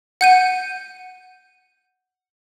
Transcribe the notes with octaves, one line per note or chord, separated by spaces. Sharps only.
F#5 G6 D#7